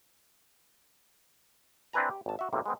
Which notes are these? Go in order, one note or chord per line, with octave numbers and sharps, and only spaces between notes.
C4 D4 E4 B4 G#5 A#5
G4
G#1 A5
F#4 E5
B1 A2 C3 A#3
G#3 B3 C4